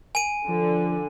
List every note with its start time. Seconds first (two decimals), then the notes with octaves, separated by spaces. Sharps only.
0.15 G#5 D#7
0.49 D3 F3